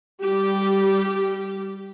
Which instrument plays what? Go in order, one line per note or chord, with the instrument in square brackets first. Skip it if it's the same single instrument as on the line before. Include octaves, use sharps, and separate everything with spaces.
[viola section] G3 G4